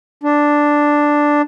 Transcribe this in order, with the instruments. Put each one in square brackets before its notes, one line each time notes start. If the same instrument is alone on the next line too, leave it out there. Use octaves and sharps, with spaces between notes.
[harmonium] D4